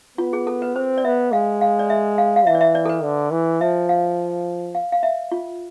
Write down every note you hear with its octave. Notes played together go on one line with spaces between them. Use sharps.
B3 F4
G#4
A4
B4
C4 C5
D5
B3 E5
G#3 F5
F5
D5
E5
F5
F5
E3 E5
D5
E5
D5
A4
B4
D3
E3
F3 E5
F5
F5
F5
E5
F4